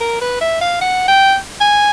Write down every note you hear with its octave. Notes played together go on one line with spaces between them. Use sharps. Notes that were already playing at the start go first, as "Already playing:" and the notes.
A#4
B4
E5
F5
F#5
G5
G#5